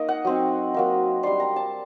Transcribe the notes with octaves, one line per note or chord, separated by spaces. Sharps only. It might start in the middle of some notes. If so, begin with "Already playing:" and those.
Already playing: A#3 D#4 D#5
F#5
F#3 C4 D#4
F#3 A#3 D#4
G3 D4 C6
A#5
A5